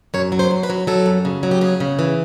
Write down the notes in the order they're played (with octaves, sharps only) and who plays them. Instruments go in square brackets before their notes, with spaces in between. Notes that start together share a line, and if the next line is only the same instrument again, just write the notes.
[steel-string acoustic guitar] F#2 C#5
F#3
C5
F#2
B4
F#3
F#3 A4
F#2
C#3
F#3
G4
C#3 G#4
C#3
E3